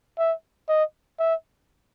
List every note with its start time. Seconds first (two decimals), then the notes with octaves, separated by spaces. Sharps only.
0.18 E5
0.69 D#5
1.19 E5